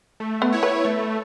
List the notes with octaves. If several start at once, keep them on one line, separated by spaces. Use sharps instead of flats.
A3
B3
E4 C#5
B4
A3